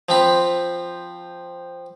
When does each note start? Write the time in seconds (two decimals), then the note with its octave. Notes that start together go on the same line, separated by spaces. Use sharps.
0.09 F3 C4 B5